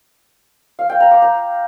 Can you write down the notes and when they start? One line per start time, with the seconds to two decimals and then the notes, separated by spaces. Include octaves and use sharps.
0.79 F5
0.90 G5
1.00 A#5
1.11 D6
1.22 A#5